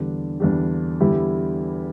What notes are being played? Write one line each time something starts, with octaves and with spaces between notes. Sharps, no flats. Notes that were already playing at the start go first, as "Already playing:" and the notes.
Already playing: E2 D3 G3 D4 G4
E2 D3 G3 D4 G4
E2 D3 G3 E4 G4